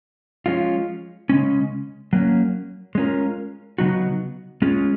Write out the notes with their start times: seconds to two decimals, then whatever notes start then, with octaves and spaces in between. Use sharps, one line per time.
0.46 F3 G#3 C#4 F4
1.29 C#3 G#3 C#4
2.13 F#3 A#3 C#4
2.95 G#3 C#4 F4 A#4
3.78 C#3 F#3 B3 D#4 F#4
4.62 G#3 C#4 F4 G#4